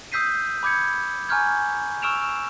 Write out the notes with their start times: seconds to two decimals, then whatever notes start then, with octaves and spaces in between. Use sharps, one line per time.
0.12 D#6 E6 G6 B6 C7 D#7
0.63 B5 D6 G6 G#6 C#7
1.29 G#5 A#5 C#6 F6 G6 G#6
2.02 C#6 E6 F6 D7 E7 F7